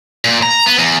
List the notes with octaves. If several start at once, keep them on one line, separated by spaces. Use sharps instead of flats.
A#2
A#5
B3
E2